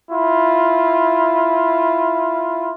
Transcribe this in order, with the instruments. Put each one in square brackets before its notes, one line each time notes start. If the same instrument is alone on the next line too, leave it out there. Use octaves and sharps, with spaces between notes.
[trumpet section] E4 F4